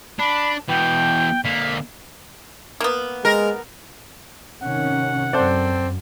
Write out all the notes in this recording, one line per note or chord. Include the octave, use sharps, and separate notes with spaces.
D4 B5
B2 E3 G5
D3 A#3 B6
A#3 B3
G#3 A#4
C3 D#3 C#4 F#5
F#2 C4 A4 C5 D5